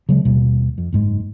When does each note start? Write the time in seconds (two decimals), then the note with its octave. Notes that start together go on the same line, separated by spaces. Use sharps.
0.09 C#3 F#3 G#3
0.25 D#2 B2 G3 A#3
0.78 F2
0.93 F#1 G#2 G#3